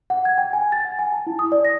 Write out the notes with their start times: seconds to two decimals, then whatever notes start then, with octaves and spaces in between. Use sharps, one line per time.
0.10 F#5
0.25 G#6
0.38 G5
0.53 G#5
0.72 A6
0.85 F#5
0.99 G#5
1.12 A5
1.27 E4
1.39 D#6
1.52 D5
1.65 A#6